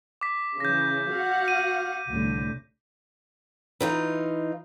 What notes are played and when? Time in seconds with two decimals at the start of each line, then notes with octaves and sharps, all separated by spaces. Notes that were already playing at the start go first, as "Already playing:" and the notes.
0.21 D6 B6
0.60 C#3 E3 G6 A#6
1.13 F#4 F5 F#5
1.48 D#7
2.10 C2 A2 D3
3.80 E3 D#4 F4